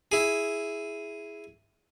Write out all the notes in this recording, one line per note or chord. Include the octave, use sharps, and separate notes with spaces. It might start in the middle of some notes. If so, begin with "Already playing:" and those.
E4 G#4